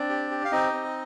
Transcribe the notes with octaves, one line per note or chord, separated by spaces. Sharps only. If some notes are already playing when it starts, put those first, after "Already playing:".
Already playing: C4 D4 D5
G4
G4
F5
C4 D#4 D#5
C4